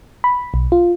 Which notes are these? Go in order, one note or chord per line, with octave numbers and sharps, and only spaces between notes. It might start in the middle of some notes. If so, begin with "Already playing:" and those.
B5
B1
F4